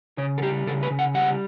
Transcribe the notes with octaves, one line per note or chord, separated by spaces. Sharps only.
C#3 C#5
A4
G3 G4
C#3 A4
B4
C#3
F#5
G3 F#5